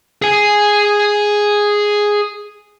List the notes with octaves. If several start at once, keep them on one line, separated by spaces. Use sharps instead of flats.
G#4 G#5